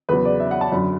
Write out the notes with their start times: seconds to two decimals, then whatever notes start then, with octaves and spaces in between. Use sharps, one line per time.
0.09 E2 C#3 F#3 B4
0.25 D5
0.40 E5
0.51 F#5
0.61 A5
0.72 F#2 D3 F#3 B5